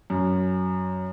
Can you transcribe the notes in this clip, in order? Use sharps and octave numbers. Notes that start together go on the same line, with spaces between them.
F#2